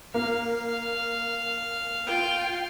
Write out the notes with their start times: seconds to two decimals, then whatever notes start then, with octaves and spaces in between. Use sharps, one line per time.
0.14 A#3 F5
2.07 F4 G5